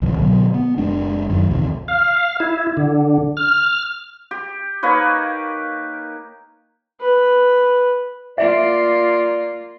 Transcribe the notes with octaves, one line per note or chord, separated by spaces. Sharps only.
C2 A2 E3 F3
B2 D3 F#3 B3
B3
F#1 G#3 D4
F#2 D#3
A#1 E2 C3 D#3
F5
E4
D3
F6
G4
A#3 D#4 B4 C#5
B4
A#3 F4 D5 E5